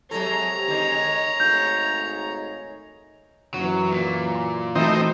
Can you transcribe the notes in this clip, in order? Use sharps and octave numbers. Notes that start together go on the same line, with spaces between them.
C3 F#3 G#3 A4 C#5 A#5
D3 D#3 G#3
G#1 C#3 A3 D#4 G6
F#2 E3 F#3
A#2
C6
E3 A3 C4 D#4 F#4 A4